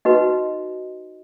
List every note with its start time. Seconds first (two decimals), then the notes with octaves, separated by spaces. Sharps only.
0.05 D#4 F#4 B4 D#5